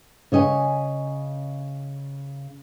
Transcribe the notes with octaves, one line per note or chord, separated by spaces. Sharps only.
C#3 C#5 D#5 G#5